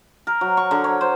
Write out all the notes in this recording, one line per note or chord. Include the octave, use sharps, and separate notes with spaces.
A#4
F#3
C#6
D3
C#5
C5